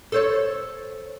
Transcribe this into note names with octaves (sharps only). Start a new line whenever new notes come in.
A4 C5 C#5